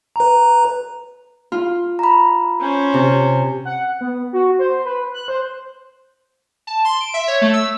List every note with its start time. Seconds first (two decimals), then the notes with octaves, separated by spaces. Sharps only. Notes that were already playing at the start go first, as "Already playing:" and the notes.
0.16 B4 A#5
1.52 F4
1.99 A#5 B5
2.60 C#4 C5
2.94 C3
3.65 F#5
4.01 B3
4.33 F#4
4.59 C5
4.85 B4
5.14 F#6
5.28 C5
6.67 A5
6.85 C6
7.01 D7
7.14 E5
7.28 C#5
7.42 A3
7.53 E6